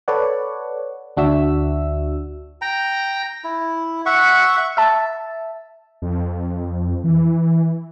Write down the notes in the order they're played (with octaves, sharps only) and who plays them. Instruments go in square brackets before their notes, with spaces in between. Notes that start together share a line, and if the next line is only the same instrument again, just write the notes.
[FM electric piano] A4 B4 C#5 D5 F#5
D2 D4 F#4 E5 E6
[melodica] G5 A#5
E4
E5 F#5 C#6
[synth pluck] E5 A5
[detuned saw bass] F2
E3